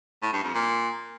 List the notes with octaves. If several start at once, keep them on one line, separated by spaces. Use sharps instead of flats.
A2
G2
F2
A#2